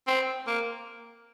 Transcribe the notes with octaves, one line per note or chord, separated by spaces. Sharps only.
C4
A#3